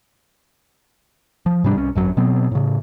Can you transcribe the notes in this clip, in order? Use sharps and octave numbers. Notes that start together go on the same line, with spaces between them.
F3
G#2 C3 G3 D4
C2 C#4
G#1 F#2 F#3
B2 F#3 B3 C4
A2 C#3